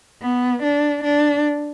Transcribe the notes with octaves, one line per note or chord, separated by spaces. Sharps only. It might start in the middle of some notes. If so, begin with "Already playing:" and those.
B3
D4
D4